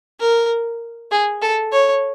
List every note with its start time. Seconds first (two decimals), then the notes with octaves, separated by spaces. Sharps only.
0.20 A#4
1.11 G#4
1.42 A4
1.73 C#5